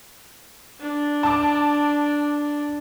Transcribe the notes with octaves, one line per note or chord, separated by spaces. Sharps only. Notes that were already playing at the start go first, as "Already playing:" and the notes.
D4
A5 D6